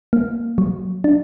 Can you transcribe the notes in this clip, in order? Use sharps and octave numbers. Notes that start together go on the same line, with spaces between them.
A#3
F#3
D4